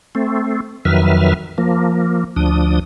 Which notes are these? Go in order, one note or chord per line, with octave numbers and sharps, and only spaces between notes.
A3 C4
F2 D#3 F#3 B4 E5 F6
F3 A#3
D2 F3 D4 D#6